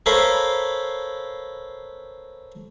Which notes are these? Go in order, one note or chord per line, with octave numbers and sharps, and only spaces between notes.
A4 A#4 C5 C#5 F5 B5